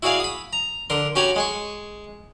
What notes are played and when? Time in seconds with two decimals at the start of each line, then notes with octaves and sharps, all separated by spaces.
0.03 E4 F#4 G#4 D5 F5 G#5
0.20 B5 D#6
0.53 A#5
0.90 D3 A#4 C6
1.15 C#4 F#4 G4 G#5 A#5 B5
1.36 G#3 G#5 C#6